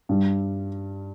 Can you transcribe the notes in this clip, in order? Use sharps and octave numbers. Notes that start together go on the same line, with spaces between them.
G2 G3